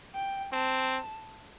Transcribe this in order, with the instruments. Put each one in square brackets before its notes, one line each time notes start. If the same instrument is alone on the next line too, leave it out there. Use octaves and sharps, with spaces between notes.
[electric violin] G5
[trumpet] C4 [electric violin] A5